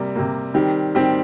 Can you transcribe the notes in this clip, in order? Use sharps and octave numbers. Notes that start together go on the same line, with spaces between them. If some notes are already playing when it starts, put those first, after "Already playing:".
Already playing: C3 G3 A#3
C3 G3 A#3
D#3 G3 C4 G4
D#3 G3 C4 G4